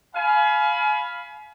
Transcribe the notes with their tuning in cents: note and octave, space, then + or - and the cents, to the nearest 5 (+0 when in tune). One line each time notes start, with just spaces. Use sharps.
F5 +0 G#5 +35 B5 +0